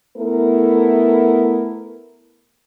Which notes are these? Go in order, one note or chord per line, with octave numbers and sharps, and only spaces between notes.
A3 B3 E4 A#4